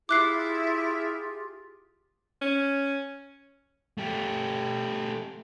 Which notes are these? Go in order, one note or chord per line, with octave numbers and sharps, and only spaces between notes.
E4 F4 G4 G#4 D6 F#6 C7
C#4
A3 G4